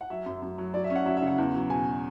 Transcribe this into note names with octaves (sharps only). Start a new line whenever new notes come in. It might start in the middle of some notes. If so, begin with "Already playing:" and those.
F#5
F#3 E5
F#2
F#2
F#3
F#3 D5
E5
C#4
F#5
F#3 E5
E5
C#3
F#5
E2
F#3
B2 G#5